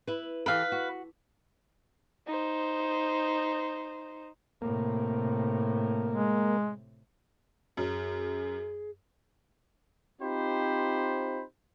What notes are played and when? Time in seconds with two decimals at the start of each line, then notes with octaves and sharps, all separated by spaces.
0.07 E4 B4
0.46 E3 G4 A4 B4 F5
0.72 F#4
2.27 D#4 C5
4.62 A2 C3 A#3
6.11 G#3
7.77 F#2 G#4
10.22 C4 D#4 F4 G4 C5 B5